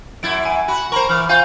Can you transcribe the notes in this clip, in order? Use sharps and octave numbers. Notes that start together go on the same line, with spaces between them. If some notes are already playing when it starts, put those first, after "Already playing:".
F#2 E4 G#6 A6 D7
G#5
F#4 B5
A#4 C5 A#5 B5 C#6
E3 F6
F4 C5 F5 G#5 G6